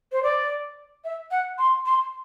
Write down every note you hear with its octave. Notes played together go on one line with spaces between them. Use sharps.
C5
D5
E5
F#5
C6
C6